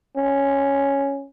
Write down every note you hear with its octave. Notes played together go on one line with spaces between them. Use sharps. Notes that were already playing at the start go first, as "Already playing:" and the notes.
C#4